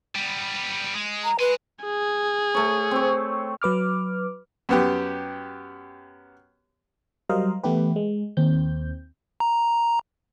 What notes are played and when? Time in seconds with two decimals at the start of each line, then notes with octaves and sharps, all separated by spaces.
0.15 G3 B3
0.94 G#3
1.24 A#5
1.39 B4 G#5 C6
1.84 G#4
2.55 A3 C#5
2.91 C4 C#5
3.62 F#3 B4 D6 F6
4.69 F#2 B3 G4
7.29 F#3 G3 A#4 C5 D#5 F5
7.63 E3 A3 B3 E4 G4 B4
7.96 G#3
8.37 D#2 C4 G6
9.40 A#5